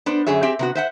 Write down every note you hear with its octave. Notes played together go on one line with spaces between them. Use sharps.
B3 D4 C5
F#2 D3 G#4 C#5 E5
C4 G4 G#4 E5
C3 B3 F#4
C5 E5 F#5